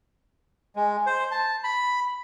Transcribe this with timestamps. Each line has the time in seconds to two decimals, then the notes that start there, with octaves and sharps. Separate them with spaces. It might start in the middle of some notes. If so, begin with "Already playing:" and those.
0.76 G#3
1.06 C5
1.31 A5
1.64 B5